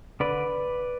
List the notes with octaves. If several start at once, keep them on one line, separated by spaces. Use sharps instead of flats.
D3 B4 D5